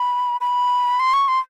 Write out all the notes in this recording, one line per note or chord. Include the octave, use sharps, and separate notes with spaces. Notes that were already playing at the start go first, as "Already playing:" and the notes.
Already playing: B5
B5
C6
C#6
C6